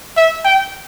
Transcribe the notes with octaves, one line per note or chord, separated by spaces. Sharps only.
E5
G5